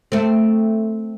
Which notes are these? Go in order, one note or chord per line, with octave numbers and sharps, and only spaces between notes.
A3 C4